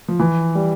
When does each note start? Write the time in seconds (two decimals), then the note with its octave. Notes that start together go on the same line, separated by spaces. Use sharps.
0.08 F3
0.19 E3
0.55 G3